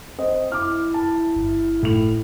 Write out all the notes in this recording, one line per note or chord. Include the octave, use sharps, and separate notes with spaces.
C4 C5 D#5
E4 D6 F6
A5
G1
A2 F7